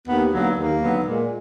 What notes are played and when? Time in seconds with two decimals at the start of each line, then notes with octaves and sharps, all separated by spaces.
0.07 D#2 B3
0.32 D3 F#3 A#3 B3 D#4
0.55 D#2 A#3
0.81 D3 F#3 B3 D#4
1.04 A#2 G#3